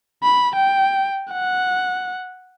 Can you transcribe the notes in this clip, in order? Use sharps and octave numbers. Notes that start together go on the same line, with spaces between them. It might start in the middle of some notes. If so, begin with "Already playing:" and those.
B5
G5
F#5